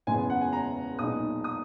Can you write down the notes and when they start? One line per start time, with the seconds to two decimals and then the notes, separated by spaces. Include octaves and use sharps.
0.07 F#1 E2 C#3 G#3 B3 G#5
0.30 F#5
0.41 G#5
0.53 A#5
0.99 B1 A#2 G#3 B3 D#4 D#6
1.44 D#6